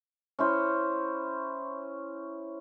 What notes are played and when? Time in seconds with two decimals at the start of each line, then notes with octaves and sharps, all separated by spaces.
0.39 C#4 E4 C5